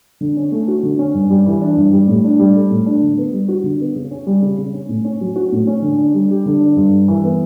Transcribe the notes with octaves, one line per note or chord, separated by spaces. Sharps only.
D3
C#4
A3
F#4
D3
C#4
G2
G3
E3
D4
G2
G3
A2
D4
G3
A4
A2
D4
D3
B3
G3
F#4
D3
B3
C#3
C#4
G3
C#3
C#3
C#4
A2
C#4
F#3
F#4
A2
C#4
D3
D4
G3
G4
D3
D4
G2
G3
E3
B3